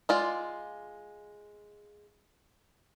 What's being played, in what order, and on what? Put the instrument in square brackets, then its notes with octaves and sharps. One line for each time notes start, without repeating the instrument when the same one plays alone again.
[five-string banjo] G#3 F4 D5